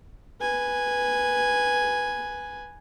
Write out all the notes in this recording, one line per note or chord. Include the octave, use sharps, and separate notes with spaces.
B4 G#5